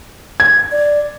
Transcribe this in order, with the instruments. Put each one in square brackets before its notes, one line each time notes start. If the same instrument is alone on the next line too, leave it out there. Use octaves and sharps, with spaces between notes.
[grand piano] G#6
[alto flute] D5